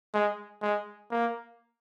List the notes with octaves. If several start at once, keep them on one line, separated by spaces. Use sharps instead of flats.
G#3
G#3
A#3